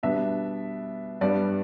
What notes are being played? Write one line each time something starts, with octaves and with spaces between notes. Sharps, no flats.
B2 G3 B3 D4 E5
G2 G3 B3 D4 D5